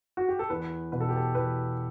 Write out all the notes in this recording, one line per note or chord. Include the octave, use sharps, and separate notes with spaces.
F#4
G4
A4
E2 B4
B2 B4
A4
G4
A4
E2 B4